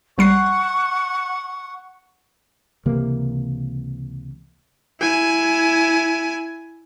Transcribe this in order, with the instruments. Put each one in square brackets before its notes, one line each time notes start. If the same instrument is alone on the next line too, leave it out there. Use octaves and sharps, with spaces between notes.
[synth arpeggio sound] A#1 G3 C7 [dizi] F#5 [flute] C#6
[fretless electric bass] C#2 C3 E3 A#3
[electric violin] E4 G#5